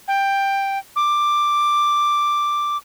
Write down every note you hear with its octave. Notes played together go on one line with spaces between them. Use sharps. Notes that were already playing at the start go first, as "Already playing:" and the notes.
G5
D6